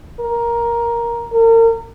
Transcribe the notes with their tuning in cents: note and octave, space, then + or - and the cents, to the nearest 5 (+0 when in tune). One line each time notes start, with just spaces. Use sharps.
A#4 +10
A#4 -35